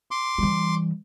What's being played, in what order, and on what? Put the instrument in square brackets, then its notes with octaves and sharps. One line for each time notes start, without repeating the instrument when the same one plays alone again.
[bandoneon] C6 D6
[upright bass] E3 G3